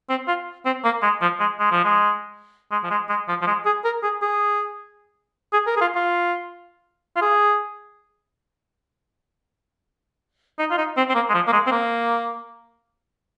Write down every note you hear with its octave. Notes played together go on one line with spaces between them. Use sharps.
C4
F4
C4
A#3
G#3
F3
G#3
G#3
F3
G#3
G#3
F3
G#3
G#3
F3
F3
G#3
G#4
A#4
G#4
G#4
G#4
A#4
G#4
F4
F4
F4
G#4
D#4
F4
D#4
C4
C4
A#3
G#3
F3
A#3
G#3
C4
A#3